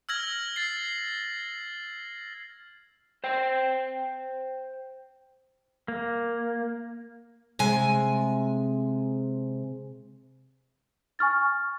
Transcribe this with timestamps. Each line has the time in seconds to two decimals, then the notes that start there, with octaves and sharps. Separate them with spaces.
0.09 E6 F6 G#6 A#6 F#7
0.56 A6 C7
3.24 C5 G5
5.88 A#3
7.59 C3 G#3 G#5
11.19 G#5 C#6 F6 A6